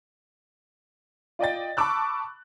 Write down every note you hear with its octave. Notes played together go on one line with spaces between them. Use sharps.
F4 D5 D#5 G5 A6
A5 B5 C#6 D6 E6 F#6